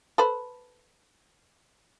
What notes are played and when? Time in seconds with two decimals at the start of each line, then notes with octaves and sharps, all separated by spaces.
0.18 A4 B4 C5